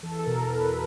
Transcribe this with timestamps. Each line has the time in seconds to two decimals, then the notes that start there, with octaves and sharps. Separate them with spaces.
0.03 E2 A4
0.19 A4
0.26 B2 A#4
0.49 E2 B4
0.64 B4